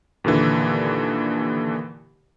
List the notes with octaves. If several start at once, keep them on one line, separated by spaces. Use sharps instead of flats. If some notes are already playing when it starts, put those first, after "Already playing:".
D#2 A#2 D3 E3